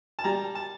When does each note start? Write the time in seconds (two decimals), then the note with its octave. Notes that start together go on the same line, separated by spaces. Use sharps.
0.19 A5
0.24 G3 A#5
0.55 A5